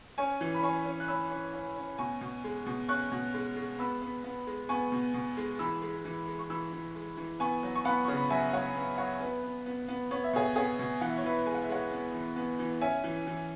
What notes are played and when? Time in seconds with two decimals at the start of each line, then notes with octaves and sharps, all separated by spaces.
0.18 C#4 G#5 C#6
0.41 E3
0.54 B5
0.63 C#4 G#5 C#6
0.85 C#4
1.00 F#6
1.08 C#4 B5 E6
1.31 C#4
1.54 C#4
1.76 C#4
1.98 B2 G#5 C#6
2.21 B2
2.44 G#3
2.66 B2
2.89 C#4 C#6 F#6
3.12 B2
3.34 G#3
3.57 G#3
3.79 B3 B5 E6
4.02 B3
4.24 B3
4.47 G#3
4.69 B3 G#5 C#6
4.92 B2
5.14 B2
5.37 G#3
5.59 E3 B5 E6
5.82 G#3
6.05 E3
6.28 G#3
6.39 C#6
6.50 E3 B5 E6
6.73 E3
6.95 G#3
7.17 E3
7.40 B3 G#5 C#6
7.63 F#3
7.75 C#6
7.85 B3 F#5 B5
8.04 C#3 C#6
8.17 B5
8.30 F#3 E5 G#5
8.53 F#3 C#5 F#5
8.75 B3
8.98 F#3 C#5 F#5
9.13 C#5
9.21 B3 B4
9.43 B3
9.66 B3
9.88 B3
10.11 B3 C#5
10.24 E5
10.33 B2 G#4 C#5
10.56 B3 G#4 C#5
10.79 B2
11.01 E3 F#5
11.10 E5
11.17 C#5
11.24 E3 B4 E5
11.46 G#3 G#5
11.54 F#5
11.63 E5
11.69 G#3 C#5 F#5
11.91 B3
12.14 E3
12.36 B3
12.59 E3
12.81 C#4 E5 G#5
13.04 E3
13.27 E3